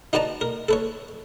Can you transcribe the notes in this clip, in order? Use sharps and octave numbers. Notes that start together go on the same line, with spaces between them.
D#4 F#4 B4 D5 A5 A#5
A#4
A4 B4 C#5